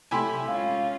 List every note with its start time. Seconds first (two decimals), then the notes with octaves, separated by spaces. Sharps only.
0.11 C3 F#3 A3 E4 G4 G#5 B5 C6
0.48 G#3 C#4 F4 F5